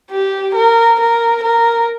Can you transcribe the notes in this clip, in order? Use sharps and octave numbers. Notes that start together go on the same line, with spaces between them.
G4
A#4
A#4
A#4